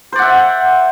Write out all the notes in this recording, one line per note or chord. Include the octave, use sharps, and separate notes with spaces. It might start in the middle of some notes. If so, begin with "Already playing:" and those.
C5 D5 E5 F#5